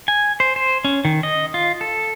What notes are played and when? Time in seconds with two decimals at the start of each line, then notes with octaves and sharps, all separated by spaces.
0.08 G#5
0.40 C5
0.56 C5
0.85 C#4
1.05 D#3
1.23 D#5
1.54 F4
1.81 A4